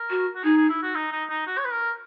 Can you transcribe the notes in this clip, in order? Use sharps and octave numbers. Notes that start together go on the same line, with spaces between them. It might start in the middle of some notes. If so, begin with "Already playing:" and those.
Already playing: A#4
F#4
F#4
D#4 G#4
G#4
E4
F#4
D#4
D#4
D#4
F#4
C#5
B4
A#4